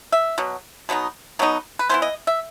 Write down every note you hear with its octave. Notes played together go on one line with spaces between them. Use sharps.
E5
B2 F#3
B2 F#3 B3 D#4
B2 F#3 B3 D#4
B4
E3 B3 E4 C5
D#5
E5